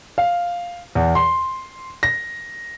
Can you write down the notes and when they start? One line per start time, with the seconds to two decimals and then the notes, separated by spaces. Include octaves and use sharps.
0.18 F5
0.95 E2
1.15 C6
2.03 A#6